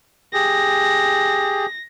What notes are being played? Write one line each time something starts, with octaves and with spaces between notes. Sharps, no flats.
G4 G#4 A#6